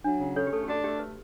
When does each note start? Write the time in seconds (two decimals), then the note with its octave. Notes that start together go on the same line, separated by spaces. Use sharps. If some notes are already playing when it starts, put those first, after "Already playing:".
0.04 F#3 D4
0.20 C#3
0.36 C#4 A4 C#5
0.47 G4
0.52 A3 A4
0.63 G4
0.68 D4 F#4
0.84 A3 G4
0.99 B4